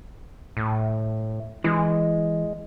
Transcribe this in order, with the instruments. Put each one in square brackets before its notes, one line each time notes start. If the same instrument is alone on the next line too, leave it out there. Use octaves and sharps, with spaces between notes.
[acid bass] A2
[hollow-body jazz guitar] E3 [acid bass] G#3